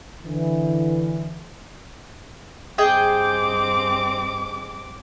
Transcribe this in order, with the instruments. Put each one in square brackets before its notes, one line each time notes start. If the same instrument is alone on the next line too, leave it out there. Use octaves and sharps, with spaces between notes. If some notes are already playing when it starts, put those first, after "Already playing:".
[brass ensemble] D3 E3
[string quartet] G2 C4 D6 [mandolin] G#4 D#5 G5